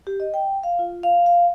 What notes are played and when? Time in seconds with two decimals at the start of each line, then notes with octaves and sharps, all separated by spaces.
0.07 G4
0.20 D#5
0.34 G5
0.63 F5
0.79 F4
1.03 F5
1.26 F5